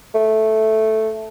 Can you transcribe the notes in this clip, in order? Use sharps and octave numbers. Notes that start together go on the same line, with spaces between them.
A3